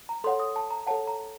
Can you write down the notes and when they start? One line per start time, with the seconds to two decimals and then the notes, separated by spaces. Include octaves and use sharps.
0.09 A#5
0.24 A4 C#5 F#5 C6
0.40 D#6
0.56 A5
0.71 A#5
0.87 A4 C#5 F#5 A5
1.07 A#5